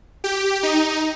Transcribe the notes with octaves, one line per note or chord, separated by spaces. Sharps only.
G4
D#4